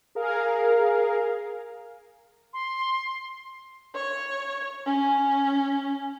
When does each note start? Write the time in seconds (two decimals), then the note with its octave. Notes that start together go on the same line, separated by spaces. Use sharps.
0.15 G#4 A#4 F5
2.53 C6
3.95 C#5
4.86 C#4